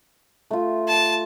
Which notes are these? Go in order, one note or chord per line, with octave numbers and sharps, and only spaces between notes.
A3 F4
A5